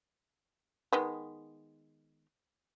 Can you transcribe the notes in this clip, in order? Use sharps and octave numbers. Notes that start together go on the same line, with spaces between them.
D#3 G#3 B3